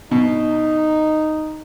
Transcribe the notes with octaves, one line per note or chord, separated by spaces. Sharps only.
B2 D#4